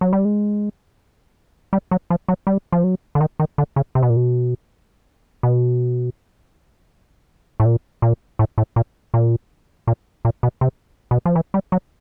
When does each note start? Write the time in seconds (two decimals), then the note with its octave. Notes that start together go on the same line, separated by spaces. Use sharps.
0.01 F#3
0.13 G3
0.25 G#3
1.73 G3
1.91 F#3
2.10 F3
2.28 F#3
2.47 G3
2.72 F3
2.84 F#3
3.15 D3
3.21 D#3
3.40 D#3
3.58 D3
3.76 C#3
3.95 C3
4.03 B2
4.10 A#2
4.16 B2
5.43 B2
7.60 A2
7.65 A#2
8.02 A#2
8.39 A2
8.58 A2
8.76 A#2
9.14 A#2
9.87 A#2
10.25 A#2
10.43 B2
10.61 C3
11.11 B2
11.26 F3
11.36 E3
11.54 G3
11.72 F#3